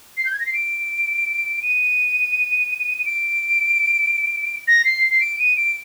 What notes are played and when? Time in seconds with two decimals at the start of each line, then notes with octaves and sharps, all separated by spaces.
0.17 C7
0.25 G6
0.32 G#6
0.40 A#6
0.46 C7
0.54 D7
1.62 D#7
3.05 D7
4.68 A#6
4.85 C7
5.10 C7
5.21 D7
5.39 D#7
5.57 D7